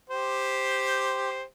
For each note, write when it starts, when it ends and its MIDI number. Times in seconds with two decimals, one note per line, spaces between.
0.10 1.42 67
0.10 1.42 72